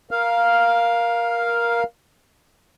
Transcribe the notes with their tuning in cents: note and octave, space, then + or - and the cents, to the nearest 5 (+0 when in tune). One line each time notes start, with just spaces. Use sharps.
A#4 +15 F5 +0